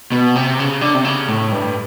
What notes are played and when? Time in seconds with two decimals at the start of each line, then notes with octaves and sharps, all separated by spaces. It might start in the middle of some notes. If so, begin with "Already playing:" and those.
0.12 B2
0.35 C3
0.59 C#3
0.81 D3
0.94 C3
1.05 C#3
1.28 A2
1.52 G2